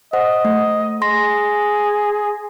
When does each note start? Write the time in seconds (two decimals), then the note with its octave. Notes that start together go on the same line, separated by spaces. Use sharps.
0.13 C5 D#5 F#5
0.45 A3
1.02 G#4 C6 A#6